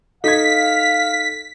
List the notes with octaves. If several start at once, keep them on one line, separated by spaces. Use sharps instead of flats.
D#4 A4 F5 G#6 B6